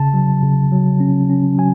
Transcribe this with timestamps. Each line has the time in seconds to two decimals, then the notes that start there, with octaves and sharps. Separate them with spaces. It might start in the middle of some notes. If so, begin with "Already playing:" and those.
Already playing: C#3 A5
0.14 F#3
0.43 C#3
0.72 F#3
1.00 C#4
1.29 C#4
1.58 F#3 G#5